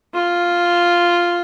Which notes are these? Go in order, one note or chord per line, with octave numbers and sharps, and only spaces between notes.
F4